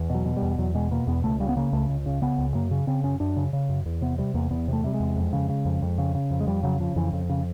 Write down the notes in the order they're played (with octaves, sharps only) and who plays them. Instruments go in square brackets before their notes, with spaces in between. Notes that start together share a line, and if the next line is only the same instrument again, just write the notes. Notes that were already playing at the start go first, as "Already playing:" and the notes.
Already playing: [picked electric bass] E2
B2 F#3
B2
G3
E2
E2 F#3
B2 G#3
B2 A#3
E2 B3
C#2 A3
C#3 G3
B3
C#3 A#3
C#2 A3
C#2
C#3
C#3 B3
C#2
F#2 A#3
C#3
C#3 C4
F#2 C#4
F#2 D4
C#3
C#3
F#2
E2
C3 B3
C3 G3
E2 A#3
E2 B3
C3 A3
C3 G3
G#3
E2
F2
C#3
C#3
F2
F2
C#3
C#3
F2
G#3
F2 G3
C#3 F#3
C#3 F3
F2 E3
F2
C#3